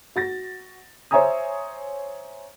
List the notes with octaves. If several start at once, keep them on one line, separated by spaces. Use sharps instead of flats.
F#4 A6 A#6
C5 C#5 E5 G#5 A#5 D#6